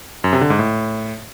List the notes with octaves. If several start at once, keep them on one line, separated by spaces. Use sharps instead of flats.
F#2
C3
D3
G#2
A2